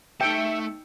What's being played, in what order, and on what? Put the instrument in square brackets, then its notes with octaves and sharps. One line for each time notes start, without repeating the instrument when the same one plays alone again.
[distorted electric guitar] A3 A5 [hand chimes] D#4 E6 C#7 [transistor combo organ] E5 [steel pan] G5